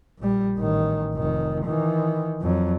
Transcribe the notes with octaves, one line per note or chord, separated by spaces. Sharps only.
A#1 G3
A1 D#3
F1 D#3
D#3 E3
F2 F#3